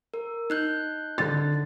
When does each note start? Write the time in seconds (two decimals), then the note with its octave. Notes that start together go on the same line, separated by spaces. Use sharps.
0.14 A#4
0.50 D#4 F#6 G6
1.18 D3 A6